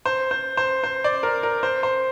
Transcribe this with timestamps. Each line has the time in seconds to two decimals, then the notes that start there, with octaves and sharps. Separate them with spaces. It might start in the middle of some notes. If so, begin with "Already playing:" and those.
0.06 C5
0.31 C5
0.57 C5
0.84 C5
1.04 D5
1.23 A#4
1.43 A#4
1.63 C5
1.83 C5